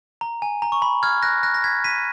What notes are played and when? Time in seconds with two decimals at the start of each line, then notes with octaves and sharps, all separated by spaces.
0.21 A#5
0.42 G#5
0.62 A#5
0.72 C#6
0.82 B5
1.03 F6 G#6
1.22 F#6 A#6
1.43 F#6 A#6
1.54 A#6
1.64 G#6 B6
1.84 B6 D#7